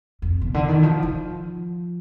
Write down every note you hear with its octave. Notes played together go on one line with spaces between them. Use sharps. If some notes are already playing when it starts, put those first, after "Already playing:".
F2
B2
D3
D#3
F3
F3